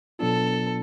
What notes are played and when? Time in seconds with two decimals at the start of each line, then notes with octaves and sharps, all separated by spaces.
0.19 B2 F#3 B3 D4 F4 A4